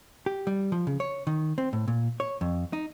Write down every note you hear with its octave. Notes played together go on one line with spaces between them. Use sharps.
G4
G3
F3
C#3
C#5
D#3
C4
A2
A#2
C#5
F2
D#4